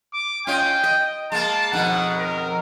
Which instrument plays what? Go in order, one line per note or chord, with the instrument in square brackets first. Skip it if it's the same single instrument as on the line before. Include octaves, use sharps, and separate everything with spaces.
[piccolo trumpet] D6
[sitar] C#4 F4 D#5 [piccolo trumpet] G5
[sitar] D#5
[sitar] G#3 A#3 [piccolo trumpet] A5
[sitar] F2 B2 D#3 [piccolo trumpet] F#5
[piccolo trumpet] A#4